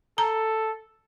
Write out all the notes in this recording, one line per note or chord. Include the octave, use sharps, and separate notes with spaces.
A4 A#5